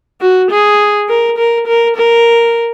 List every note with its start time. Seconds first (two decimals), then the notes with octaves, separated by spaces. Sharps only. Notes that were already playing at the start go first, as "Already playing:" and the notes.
0.21 F#4
0.51 G#4
1.09 A#4
1.38 A#4
1.67 A#4
1.96 A#4